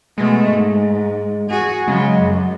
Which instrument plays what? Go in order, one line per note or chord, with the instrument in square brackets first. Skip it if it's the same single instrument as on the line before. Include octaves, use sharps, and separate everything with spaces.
[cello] B2 A3 [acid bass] G#3
[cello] G#2
F#4 G#4
[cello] C#3 F#3 [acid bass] G#3
[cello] F#2